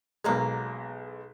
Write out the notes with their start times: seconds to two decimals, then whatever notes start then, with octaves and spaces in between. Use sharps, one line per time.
0.24 B1 B2 F3 F#3 G#3 A#3